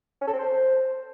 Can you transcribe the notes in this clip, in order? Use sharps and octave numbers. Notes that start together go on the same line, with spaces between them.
C#4
A4
C4
C5